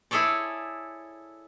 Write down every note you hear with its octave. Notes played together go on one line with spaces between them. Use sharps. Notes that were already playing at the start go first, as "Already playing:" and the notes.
E4 G#4 A4 C#5 D5